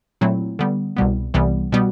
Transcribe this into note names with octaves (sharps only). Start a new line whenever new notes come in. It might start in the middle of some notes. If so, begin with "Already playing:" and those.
A#2 F#3 A3 C4 E4
D3 G3 B3
C2 B2 G3 B3
C2 C3 E3 G3 B3
B2 G3 B3